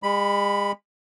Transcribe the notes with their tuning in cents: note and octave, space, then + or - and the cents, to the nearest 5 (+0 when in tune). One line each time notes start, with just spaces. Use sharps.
G#3 -45 B5 +0